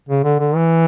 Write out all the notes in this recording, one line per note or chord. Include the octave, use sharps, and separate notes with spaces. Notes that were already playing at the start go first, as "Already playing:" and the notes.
C#3
D3
D3
E3